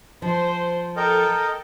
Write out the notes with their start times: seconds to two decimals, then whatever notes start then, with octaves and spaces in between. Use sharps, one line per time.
0.22 F3 C5
0.97 A4 A#4 D#5 G5